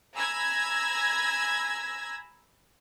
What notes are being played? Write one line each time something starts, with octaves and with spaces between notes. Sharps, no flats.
G#5 A#5 B5 E6 G#6 A#6